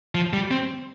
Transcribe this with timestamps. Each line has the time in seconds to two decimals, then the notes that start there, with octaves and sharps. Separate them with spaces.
0.15 F3
0.33 G3
0.51 C4